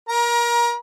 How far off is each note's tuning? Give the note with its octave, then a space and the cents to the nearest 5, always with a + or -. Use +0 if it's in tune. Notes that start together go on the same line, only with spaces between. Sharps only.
A#4 +25 A#5 +35